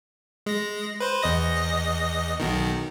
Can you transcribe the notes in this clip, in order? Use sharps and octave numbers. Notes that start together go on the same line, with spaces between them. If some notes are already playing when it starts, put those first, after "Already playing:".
G#3 A#6
B4 C5
E2 D#5 A#6
B1 B2 D#3